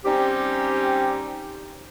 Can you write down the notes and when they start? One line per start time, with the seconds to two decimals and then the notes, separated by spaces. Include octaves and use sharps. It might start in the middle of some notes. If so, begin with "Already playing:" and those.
0.05 G3 C4 C#4 D#4 G4